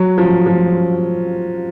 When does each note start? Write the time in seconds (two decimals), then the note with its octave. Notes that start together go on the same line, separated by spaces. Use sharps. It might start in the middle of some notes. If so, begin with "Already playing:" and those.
Already playing: F#3
0.18 F3
0.46 F3